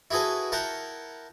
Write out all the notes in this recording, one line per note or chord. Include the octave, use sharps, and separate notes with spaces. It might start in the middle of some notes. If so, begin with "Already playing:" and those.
E4 F#4 G#4 A4 B4
E4 A#4 F#5 G5 A5